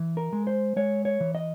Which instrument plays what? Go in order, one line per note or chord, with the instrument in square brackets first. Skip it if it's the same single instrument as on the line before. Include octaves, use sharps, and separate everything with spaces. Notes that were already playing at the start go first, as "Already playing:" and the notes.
Already playing: [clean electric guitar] E3
A#4
G#3
C5
G#3 C#5
C#5
E3
D#5